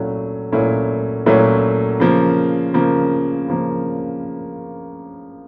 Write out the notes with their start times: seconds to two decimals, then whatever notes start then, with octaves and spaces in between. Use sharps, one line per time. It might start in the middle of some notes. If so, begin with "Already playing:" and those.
Already playing: A#2 F#3 A3 C#4 E4
0.52 A#2 F#3 A3 C#4 E4
1.26 A#2 F#3 A3 C#4 E4
2.00 C#3 F3 A#3
2.74 C#3 F3 A#3
3.48 C#3 F3 A#3